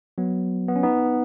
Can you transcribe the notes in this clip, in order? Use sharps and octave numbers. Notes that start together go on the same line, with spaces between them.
F#3 B3
B3
C#4
B3 D#4